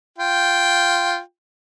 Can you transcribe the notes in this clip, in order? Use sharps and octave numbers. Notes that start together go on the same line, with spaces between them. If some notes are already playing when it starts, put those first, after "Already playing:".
F4 G5